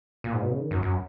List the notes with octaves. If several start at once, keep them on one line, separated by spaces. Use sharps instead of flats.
A#2
G#2
B2
C#3
D#3
F#2
F#2